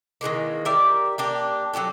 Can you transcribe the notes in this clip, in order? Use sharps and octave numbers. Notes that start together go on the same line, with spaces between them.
D#3 E3 G#3 A#3
G4 A#4 D5 E5
A#3 D4 G4
F#3 F#4 G4 A4